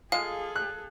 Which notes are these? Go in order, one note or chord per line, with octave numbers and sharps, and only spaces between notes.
G#3 F4 G#4 A4 F5
F#6